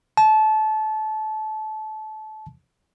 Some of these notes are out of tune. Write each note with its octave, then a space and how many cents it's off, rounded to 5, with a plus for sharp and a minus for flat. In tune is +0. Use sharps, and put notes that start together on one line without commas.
A5 -25